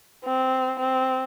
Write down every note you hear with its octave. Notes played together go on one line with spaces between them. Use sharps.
C4
C4